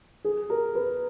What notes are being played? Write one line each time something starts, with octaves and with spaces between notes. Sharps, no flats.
G#4
A#4
B4